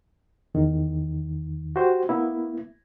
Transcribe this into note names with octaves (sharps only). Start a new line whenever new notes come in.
E2 D#3
F#4 G4 C5
A#3 B3 E4